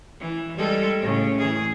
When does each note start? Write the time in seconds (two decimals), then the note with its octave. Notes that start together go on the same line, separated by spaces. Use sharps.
0.20 E3
0.58 G3 G#3 A4
0.99 A2 C#3
1.38 E3 G#4